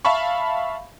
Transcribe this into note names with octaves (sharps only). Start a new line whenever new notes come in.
E5 F5 A5 B5 C#6